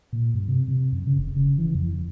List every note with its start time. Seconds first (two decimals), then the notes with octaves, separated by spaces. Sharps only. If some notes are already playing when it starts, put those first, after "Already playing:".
0.13 A#2
0.34 G2
0.48 C3
0.68 C3
0.92 F#2
1.07 C#3
1.18 F1
1.36 C#3
1.58 E3
1.75 F2